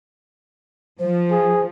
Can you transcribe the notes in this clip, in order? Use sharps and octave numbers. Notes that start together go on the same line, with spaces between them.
F3 C5
G#4